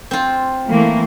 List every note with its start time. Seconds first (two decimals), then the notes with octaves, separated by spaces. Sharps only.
0.11 C4 F4
0.68 E3 A3 A#3